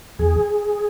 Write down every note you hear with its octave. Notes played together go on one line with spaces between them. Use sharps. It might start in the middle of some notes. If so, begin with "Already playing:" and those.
E2 G#4